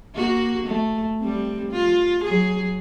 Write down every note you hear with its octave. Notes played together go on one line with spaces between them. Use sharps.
A#3 F#4
A3
G3 C4
F4
F#3 G#4